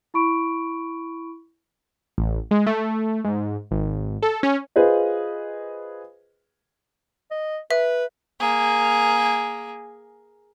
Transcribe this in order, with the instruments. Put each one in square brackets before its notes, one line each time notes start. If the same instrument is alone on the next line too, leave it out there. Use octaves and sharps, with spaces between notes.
[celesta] E4 B5 C#6 D7
[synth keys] A1
G#3
A3
G#2
G#1
A4
C#4
[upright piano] F4 G#4 B4 C5 D#5
[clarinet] D#5
[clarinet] B4 [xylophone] E5
[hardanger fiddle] A#3 G#4